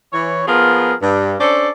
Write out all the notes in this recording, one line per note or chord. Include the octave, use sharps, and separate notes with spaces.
E3 C#5
F3 B3 F4 G#4 A#4
G2
C#4 D4 A4 C5 D5